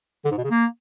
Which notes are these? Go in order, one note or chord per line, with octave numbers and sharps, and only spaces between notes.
D3
G#2
B2
C#3
A#3